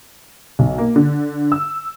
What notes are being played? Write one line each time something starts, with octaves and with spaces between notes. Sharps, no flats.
B1
A#3
D3
E6